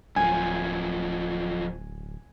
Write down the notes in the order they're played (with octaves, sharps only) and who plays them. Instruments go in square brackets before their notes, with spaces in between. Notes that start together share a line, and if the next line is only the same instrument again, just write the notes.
[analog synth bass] D1 [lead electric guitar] F#2 F3 [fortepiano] G#5